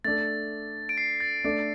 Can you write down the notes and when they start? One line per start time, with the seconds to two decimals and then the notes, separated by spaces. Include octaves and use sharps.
0.04 A3 D4 A4 A6
0.89 D7
0.97 C7
1.20 A6
1.44 A3 D4 A4